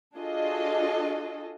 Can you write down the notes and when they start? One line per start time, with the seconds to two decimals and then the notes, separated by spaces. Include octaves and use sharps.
0.17 D4 F4 F#4 G#4 A4 D#5